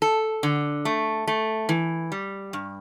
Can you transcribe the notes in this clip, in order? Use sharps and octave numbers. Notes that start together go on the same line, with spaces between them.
A4
D3
A3
A3
E3
G3
G2